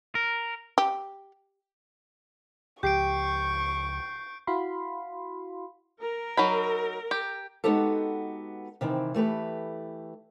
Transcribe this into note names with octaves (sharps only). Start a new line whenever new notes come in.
A#4
G4
C#2 F3 G4 C#6 G6 C7 D7
E4 F#4 F5 B5 C6
A#4
F#3 D#4 B5
G4
G#3 B3 D#4 F#4 G4 A4
C3 D#3 E3 C4
E3 A3 G4 B4